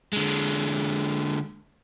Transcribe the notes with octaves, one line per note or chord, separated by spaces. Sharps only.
D3 G#3